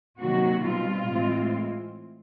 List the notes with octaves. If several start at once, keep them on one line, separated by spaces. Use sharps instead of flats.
C3 D#3 F#3 A#3 F#4
B2 G3 C4 F4
A2 E3 G#3 C4